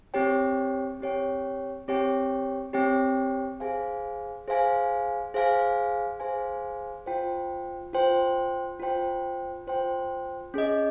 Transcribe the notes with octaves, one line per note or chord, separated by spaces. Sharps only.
C4 G4 C#5 G5
C4 G4 C#5 G5
C4 G4 C#5 G5
C4 G4 C#5 G5
G#4 C5 F5 G#5
G#4 C5 F5 G#5
G#4 C5 F5 G#5
G#4 C5 F5 G#5
F4 C5 G5
F4 C5 G5
F4 C5 G5
F4 C5 G5
C#4 G#4 D#5